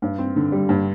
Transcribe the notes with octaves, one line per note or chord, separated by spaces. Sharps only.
G2
C4
D3
G3
G2